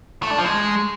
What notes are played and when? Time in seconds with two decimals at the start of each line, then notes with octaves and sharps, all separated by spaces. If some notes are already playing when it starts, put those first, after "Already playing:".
0.23 A3
0.31 D4
0.38 F3
0.46 G#3